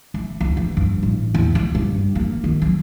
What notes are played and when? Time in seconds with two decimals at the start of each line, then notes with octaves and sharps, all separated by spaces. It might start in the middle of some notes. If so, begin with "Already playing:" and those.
0.14 A3
0.41 D2
0.57 E3
0.77 G2
1.03 A1
1.34 E2
1.55 C#2
1.75 G2
2.15 A#3
2.44 D#3
2.62 F#3